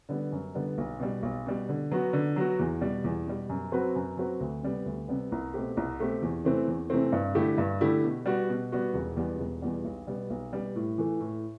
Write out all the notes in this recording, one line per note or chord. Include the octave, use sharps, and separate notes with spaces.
D3 G3 B3
F#2
D3 G3 B3
B1
B2 G3
B1
B2 G3
D3
F#3 B3 F#4
D3
F#3 B3 F#4
E2
B2 G3
E2
B2 G3
F#2
F#3 C4 F#4 B4
F#2
F#3 C4 F#4 B4
D2
C3 G3 B3
D2
C3 G3 B3
C2
B2 A3 C4 G4
C2
B2 A3 C4 G4
E2
C3 E3 A3 C4
E2
C3 E3 A3 C4
G2
D3 A3 E4 G4
G2
D3 A3 E4 G4
B2
G3 B3 F#4
B2
G3 B3 F#4
E1
E2 B2 G3 B3
E1
E2 B2 G3 B3
B1
B2 G3 B3
B1
B2 G3 B3
A2
E3 A3
A2